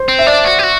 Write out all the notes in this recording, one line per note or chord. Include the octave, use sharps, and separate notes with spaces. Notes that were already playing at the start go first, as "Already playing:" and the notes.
Already playing: C5
C4
E5
D4 D5
F#4
G4
F#4